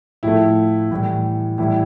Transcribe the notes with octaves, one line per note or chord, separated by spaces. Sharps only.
A2 F3 A3 E4
A2 E3 G3
A2 E3 G3 E4